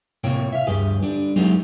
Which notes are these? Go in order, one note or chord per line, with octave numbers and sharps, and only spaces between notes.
A2 C3 A#3 C#5 G5
E5 F5
D2 G2 G4 G#4 B4
D3 G3 D4
F#3 G#3 A3 B3 D#4 G4